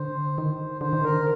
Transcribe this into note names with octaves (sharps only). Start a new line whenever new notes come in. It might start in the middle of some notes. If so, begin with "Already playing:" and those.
Already playing: D3 C5
D#3
D3 C5
D#3
D3 A#4